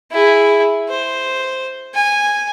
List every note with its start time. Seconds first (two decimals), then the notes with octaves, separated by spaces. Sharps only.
0.11 E4 G#4
0.89 C5
1.94 G#5